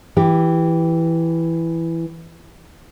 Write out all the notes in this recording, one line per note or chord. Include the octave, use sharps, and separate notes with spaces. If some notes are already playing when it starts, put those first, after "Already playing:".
E3 G4